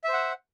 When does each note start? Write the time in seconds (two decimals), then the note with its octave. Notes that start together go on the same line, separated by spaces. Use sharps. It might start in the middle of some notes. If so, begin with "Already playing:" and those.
0.04 E5
0.09 C5
0.13 F#5